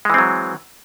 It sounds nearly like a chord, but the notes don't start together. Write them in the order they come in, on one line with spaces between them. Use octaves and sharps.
G#3 E3 C4 F#3